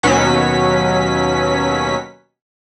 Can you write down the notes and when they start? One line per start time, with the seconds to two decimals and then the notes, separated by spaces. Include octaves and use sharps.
0.03 D#2 B2 F#3 C#4 B6